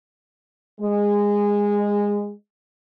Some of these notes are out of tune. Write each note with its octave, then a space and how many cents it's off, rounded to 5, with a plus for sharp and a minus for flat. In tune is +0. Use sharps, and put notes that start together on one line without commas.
G#3 -20